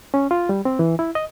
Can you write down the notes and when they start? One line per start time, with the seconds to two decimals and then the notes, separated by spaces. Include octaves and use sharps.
0.14 C#4
0.31 F4
0.49 G3
0.65 C4
0.79 E3
0.99 E4
1.15 D#5